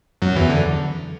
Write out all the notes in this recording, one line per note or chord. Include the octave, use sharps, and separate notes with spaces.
F#2 F#3
E2 E3
D3